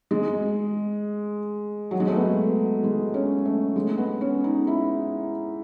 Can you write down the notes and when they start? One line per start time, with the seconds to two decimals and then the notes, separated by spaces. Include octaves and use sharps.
0.11 G#3
1.91 F#3
2.00 G#3
2.07 A3
2.16 B3
2.84 G#3
3.14 C#4
3.45 A3
3.76 G#3
3.98 B3
4.21 C#4
4.44 D#4
4.67 E4